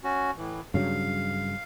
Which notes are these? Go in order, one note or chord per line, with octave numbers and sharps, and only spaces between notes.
C#4 F#4
A2 E3
G2 C#3 F#3 F5